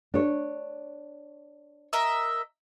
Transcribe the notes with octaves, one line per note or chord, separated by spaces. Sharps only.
D4 C#5
A#4 D#5 E5